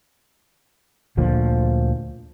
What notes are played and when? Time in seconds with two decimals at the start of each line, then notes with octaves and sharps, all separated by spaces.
1.17 D2 A#2 D3 F3